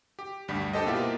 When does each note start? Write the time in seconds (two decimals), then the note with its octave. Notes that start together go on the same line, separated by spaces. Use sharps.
0.19 G4
0.48 D2 G2 G3 B6
0.73 D4 G4 A4 C5 D#5
0.86 B2 A#3 B3 E4 F4 G4